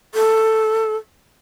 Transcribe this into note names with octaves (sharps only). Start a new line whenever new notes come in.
A4